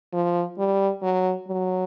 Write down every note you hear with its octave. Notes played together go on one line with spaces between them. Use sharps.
F3
G3
F#3
F#3